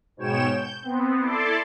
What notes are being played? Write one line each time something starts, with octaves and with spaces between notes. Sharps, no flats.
G#2 B2 C#5 G5 E7
G6
B3 C4
E4 A4 D5 A5 C6 D6